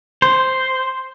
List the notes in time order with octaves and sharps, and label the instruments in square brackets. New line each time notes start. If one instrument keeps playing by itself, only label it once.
[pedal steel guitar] C5